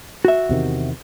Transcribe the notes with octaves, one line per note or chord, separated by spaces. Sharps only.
F#4 E5
E2 C3 D#3